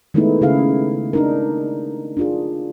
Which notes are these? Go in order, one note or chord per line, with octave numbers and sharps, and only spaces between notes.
D#3 G#3 A3 B3 D#4 E4
C#3 E4 G#4 F5
D4 D#4 A#4
D4 F4 G#4